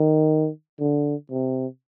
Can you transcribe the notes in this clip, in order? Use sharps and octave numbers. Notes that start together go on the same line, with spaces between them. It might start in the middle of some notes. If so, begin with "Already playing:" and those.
Already playing: D#3
D3
C3